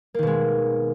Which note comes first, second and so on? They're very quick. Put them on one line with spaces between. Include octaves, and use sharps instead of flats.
A#3 D#3 B2 G#3